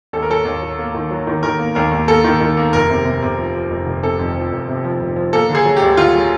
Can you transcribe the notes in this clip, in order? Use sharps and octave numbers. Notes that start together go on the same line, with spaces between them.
D#2 A4
A#4
F#3 A4
D#2
F#3
A#3
D#3
F#3
D#3
D#3 A#4
A#3
D#2 A#4
D#2
A#3 A4
D#3
D#3
A#3
F1 A#4
C3
C3
C3
F3
F3
F1
F1
C3 A4
F2
F3
F1
C3
F3
F1
F3
A#3 A4
D3
G#4
F#3
G4
D2
D2 F4
F#3